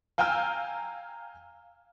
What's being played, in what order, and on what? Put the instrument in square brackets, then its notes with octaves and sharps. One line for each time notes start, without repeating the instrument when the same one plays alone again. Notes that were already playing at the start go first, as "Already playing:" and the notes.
[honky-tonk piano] F5 G5 G#5 A#5 E6 F6